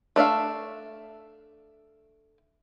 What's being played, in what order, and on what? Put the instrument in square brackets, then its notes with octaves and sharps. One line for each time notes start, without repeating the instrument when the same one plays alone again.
[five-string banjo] A3 D4 E5 F5